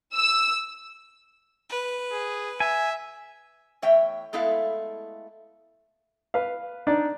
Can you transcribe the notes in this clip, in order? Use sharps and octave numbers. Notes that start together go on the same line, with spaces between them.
E6
B4
G#4
E5 G#5
E2 A3 C#5 E5 G5
G#3 A3 B3 E4 A4 F5
B4 F5
D4 D#4 D5